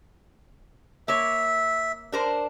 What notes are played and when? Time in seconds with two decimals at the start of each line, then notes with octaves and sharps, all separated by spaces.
1.08 A#3 C#5 E5
2.12 D4 A#4 C5